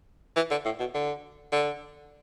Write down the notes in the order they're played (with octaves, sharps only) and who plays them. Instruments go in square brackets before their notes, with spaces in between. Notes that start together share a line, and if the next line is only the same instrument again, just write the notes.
[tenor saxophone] E3
D3
A2
B2
D3
D3